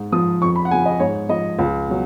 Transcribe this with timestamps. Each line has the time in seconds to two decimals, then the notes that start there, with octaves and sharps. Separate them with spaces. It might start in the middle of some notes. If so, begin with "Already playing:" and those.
Already playing: G#2
0.12 F3 D#6
0.42 F2 C#6
0.56 B5
0.65 F#5
0.71 C#3 F3 G#5
0.86 D#5
1.00 G#2 C#5
1.29 F3 D#5
1.59 C#2
1.87 B2 F#3